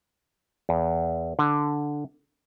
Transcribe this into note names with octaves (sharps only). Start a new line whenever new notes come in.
E2
D3